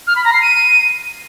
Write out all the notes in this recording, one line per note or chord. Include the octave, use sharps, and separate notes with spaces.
F6
B5
A#5
C7
D#7